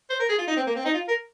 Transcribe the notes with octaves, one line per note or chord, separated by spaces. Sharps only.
C5
A#4
G#4
F4
D#4
C4
A#3
C4
D#4
F4
A#4